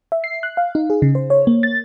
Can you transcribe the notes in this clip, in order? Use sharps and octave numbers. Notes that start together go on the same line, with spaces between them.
E5
C7
F#6
F5
D#4
G#4
C#3
C5
C#5
A#3
A6